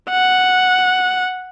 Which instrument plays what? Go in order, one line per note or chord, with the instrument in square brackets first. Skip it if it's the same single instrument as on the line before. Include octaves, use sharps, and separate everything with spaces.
[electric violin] F#5